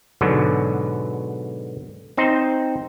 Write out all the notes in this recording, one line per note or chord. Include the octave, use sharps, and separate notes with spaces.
G#2 B2 D3 F#3
C4 D#4 C5